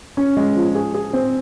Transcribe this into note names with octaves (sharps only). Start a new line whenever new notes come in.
C#4
G#3
F3
G#4
G#4
C4